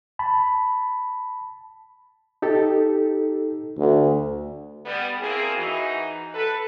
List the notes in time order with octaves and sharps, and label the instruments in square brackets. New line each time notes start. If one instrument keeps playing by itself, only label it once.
[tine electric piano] A5 B5
[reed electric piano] D#4 G4 A4
[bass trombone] D2
[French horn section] G3 B3
A#3 C4 E4 G#4
E3 D#4 F#4
A4 B4